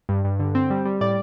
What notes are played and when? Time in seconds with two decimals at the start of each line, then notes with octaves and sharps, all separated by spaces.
0.09 G2
0.24 G2
0.40 D3
0.55 C4
0.70 G3
0.85 G3
1.01 A2 D5